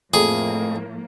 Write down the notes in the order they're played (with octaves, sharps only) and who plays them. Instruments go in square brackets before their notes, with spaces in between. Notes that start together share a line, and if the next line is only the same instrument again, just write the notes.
[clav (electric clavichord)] F2 [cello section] A2 F3 A#3 [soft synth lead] A3 [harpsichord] G#4